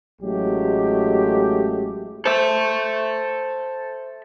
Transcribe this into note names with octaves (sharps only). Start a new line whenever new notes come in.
A1 F#3 G#3 A3 G4
A4 C5 E5